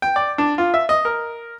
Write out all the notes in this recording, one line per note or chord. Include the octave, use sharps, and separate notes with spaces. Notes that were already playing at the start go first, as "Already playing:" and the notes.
G5
D5
D4
F4
E5
D#5
A#4